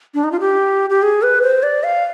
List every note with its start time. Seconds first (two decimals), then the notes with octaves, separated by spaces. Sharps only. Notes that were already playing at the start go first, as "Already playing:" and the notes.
0.14 D4
0.24 D#4
0.32 F4
0.40 G4
0.90 G4
1.02 G#4
1.22 B4
1.42 C5
1.63 D5
1.84 F5